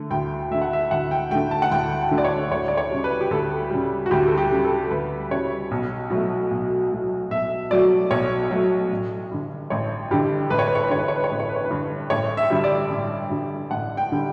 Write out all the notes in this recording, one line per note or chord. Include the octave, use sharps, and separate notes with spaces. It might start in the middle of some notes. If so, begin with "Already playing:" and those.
Already playing: D3 A3
D2 G5
D3 A3 E5
F#5
E5
D2 F#5
G5
D3 A3 G5
A5
F#5
D2 G5
D3 A3
D5
C#5
D2 C#5
D5
C#5
C#3 G3
B4
G4
D2 A4
C#3 G3
F#4
D2 G4
A4
G4
C#3 G3
A4
D2 B4
C#3 G3 C#5
B1
B2 F#3 A3
B1
B2 F#3 A3
B1 E5
B2 F#3 A3 D5
B1 C#5
B2 F#3 A3
A1
G2 D3
A1 C#5
G2 D3 G4
A1 B4
C#5
B4
C#5
B4
D3 C#5
G2 B4
C#5
B4
C#5
A1 B4
C#5
B4
C#5
B4
G2 D3
A1 C#5
E5
G2 D3 G3
D5
A1
G2 D3 G3
A1 F#5
G5
D3 G3